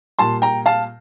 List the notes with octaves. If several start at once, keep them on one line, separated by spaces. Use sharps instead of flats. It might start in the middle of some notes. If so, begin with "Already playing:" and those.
A#2 G3 A5 C6
G5 A#5
F5 A5